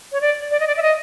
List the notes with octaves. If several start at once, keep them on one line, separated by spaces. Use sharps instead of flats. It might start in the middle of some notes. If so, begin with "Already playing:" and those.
C#5
D5
D5
D#5
D5
E5
D#5